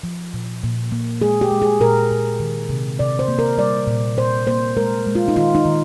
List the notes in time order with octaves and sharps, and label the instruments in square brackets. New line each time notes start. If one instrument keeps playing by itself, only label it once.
[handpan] F3
A#2
A#2
A#3
G#3 G#4
G4
G#3
G#4
A#2 A#4
A#2
D#3
C3
C3 D5
C5
A#3
A#4
G3 D5
A#2
A#2 C5
A#3 C5
G#3 A#4
G#3
F4
D#4
D#3 F4
D#4
D#3